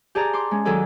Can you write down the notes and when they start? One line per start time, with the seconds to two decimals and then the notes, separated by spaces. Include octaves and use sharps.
0.15 G4 G#4 D5 A5 A#5
0.33 C6 D6
0.51 G#3 C#4
0.65 D#3 F#3 G#4 A4 D5